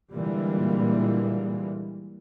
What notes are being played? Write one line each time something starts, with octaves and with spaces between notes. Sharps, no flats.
A#2 D3 E3 G3 G#3 A#3